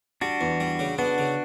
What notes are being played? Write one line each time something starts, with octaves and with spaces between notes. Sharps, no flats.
G3 D4 F#4
E2
G3
C#3
B3 D4 F#4
C#3